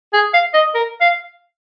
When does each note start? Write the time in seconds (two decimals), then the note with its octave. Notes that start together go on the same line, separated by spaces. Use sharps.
0.13 G#4
0.34 F5
0.54 D#5
0.74 A#4
1.01 F5